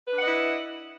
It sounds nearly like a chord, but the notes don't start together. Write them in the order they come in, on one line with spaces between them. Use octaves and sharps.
B4 D4 F#5 D#5 E4